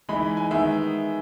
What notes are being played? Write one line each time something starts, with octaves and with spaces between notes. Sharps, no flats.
E3 G#3 D#4 B5
G#5
D#3 G#3 B3 E5